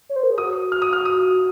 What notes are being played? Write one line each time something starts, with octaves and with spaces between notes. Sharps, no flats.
C#5
C5
A#4
G#4
F#4 D#6
F6
D#6
F6
D#6